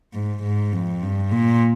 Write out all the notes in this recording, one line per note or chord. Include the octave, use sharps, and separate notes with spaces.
G#2
G#2
F2
G2
A#2